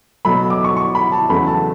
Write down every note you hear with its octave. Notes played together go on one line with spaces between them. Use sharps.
B2 F#3 A3 B5
D6
C#6
C#6
B5
A5
E2 C#3 F#3 A3 B5
A5